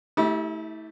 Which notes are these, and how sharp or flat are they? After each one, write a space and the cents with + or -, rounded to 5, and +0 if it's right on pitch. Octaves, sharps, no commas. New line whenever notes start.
A3 +0 E4 -40 G4 +0